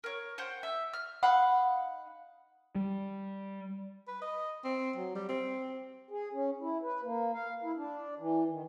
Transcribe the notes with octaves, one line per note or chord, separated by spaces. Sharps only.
A#4 C#5
C5 F#5 G5
E5
F6
D#4 F5 F#5 B5
G3
B4
D#5
C4
F#3
G3
C4
G#4
C#4
E4
B4
A#3
F5
E4
D4
E3
D#3